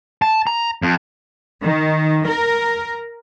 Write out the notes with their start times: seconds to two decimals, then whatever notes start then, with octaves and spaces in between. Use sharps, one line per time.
0.22 A5
0.47 A#5
0.83 F2
1.64 D#3
2.28 A#4